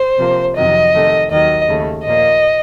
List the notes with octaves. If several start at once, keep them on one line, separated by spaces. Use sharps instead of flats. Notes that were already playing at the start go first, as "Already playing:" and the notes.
Already playing: C5
C3 F3 A#3
F2 C3 D#3 F#3 D#5
C3 D#3 A3
D#2 D#3 F#3 D#5
D#2 C#3 A3
A#2 F3 A#3 D#5